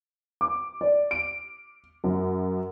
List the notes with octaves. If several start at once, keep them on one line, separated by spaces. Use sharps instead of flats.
D6
D5
D7
F#2